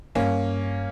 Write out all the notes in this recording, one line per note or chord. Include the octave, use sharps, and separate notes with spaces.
G2 A#3 C#4